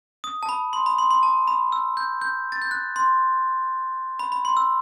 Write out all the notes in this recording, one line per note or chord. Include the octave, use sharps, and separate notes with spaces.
D#6
A5
B5
C6
B5
C6
C6
A5
B5
E6
G6
G6
A6
G6
F#6
C6
B5
B5
C6
E6